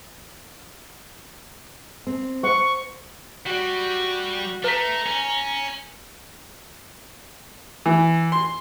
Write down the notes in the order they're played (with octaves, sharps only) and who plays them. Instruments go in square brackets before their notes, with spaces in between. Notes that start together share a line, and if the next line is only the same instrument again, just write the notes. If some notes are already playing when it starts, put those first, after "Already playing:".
[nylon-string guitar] C4
[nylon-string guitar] C5 F#5 [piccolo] C#6
[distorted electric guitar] G3 D5 [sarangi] F#4
[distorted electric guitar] A3 [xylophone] B4 B6 [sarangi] A#5
[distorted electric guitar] C#4
[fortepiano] E3
C6